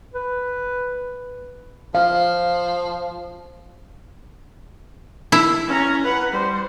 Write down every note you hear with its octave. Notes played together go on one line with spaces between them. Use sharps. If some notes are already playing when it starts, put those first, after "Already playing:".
B4
F3 F5
E4
C#4 A#5
B4 F#5
G3 C5